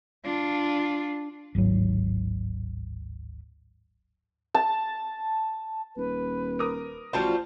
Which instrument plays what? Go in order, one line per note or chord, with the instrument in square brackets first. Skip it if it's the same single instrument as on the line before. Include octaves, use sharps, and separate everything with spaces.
[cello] D4 F4
[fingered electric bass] D1 G#1 G#2 F#3
[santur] A5
[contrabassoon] D#1 [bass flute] B4
[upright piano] A#4 D6 D#6
[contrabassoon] A1 [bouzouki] F3 G3 F4 [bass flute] F#4 [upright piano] C5 A5